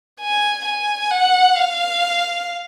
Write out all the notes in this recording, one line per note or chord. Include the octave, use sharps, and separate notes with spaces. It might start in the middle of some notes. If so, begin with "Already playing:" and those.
G#5
G#5
F#5
F5